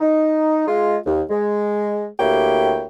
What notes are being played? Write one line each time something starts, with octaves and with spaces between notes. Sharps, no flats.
D#4
G#3 F4
D#2
G#3
D2 A#3 E4 G4 C#5 G5